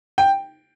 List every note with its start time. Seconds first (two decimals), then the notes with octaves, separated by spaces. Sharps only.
0.18 G5